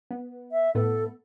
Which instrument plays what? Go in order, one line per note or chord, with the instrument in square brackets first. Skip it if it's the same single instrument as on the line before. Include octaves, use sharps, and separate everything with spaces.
[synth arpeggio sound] B3
[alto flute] E5
[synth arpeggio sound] A2 A3 B3 [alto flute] A4